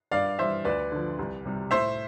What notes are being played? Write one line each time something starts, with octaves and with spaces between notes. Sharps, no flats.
G2 D5 F5
E3 G3 C5 E5
D2 B4 D5
D3 F3
C2
C3 G3
A2 C5 E5